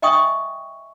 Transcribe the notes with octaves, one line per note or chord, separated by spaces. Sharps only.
D#5 E5 G5 G#5 C#6 D#6